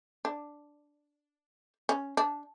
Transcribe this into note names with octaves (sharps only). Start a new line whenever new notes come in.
D4
C#4
D4